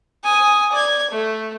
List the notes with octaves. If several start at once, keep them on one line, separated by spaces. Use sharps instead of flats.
G#5 D#6
D5 G#6
A3